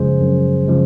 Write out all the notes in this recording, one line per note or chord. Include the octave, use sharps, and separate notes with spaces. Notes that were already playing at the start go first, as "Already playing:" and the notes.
Already playing: F#2 C#3 F3 G#3 G#4 C5
F#2
C#3 F3 G#3